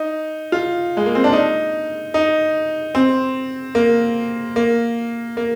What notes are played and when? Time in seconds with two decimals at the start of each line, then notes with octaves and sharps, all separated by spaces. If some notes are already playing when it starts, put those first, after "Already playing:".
Already playing: D#4
0.52 F4
0.97 G#3
1.06 A#3
1.15 C4
1.24 D4
1.33 D#4
2.14 D#4
2.95 C4
3.75 A#3
4.56 A#3
5.37 A#3